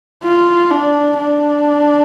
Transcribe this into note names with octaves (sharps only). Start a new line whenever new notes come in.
F4
D4
D4